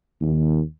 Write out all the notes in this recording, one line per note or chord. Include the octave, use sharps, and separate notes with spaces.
D#2